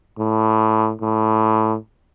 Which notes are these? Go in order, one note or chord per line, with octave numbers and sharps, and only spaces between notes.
A2
A2